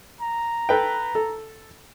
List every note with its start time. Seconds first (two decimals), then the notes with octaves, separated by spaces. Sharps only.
0.21 A#5
0.69 A4 B4 G5
1.15 A4